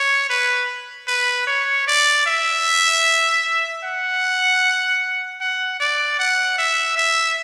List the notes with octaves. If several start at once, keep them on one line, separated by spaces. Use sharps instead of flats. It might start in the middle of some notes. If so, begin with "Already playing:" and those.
Already playing: C#5
B4
B4
C#5
D5
E5
F#5
F#5
D5
F#5
E5
E5